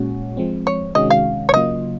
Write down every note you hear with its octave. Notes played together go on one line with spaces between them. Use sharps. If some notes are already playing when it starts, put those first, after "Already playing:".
Already playing: A#2 G#3 C#4 F#4
F3 G#3 C4
C#5
C3 D#3 G#3 C#4 F#4 D#5
F5
C#5
C#3 F#3 A#3 F4 D#5